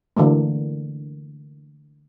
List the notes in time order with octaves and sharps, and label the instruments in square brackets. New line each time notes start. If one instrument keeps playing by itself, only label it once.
[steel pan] D3 E3 A3 A#3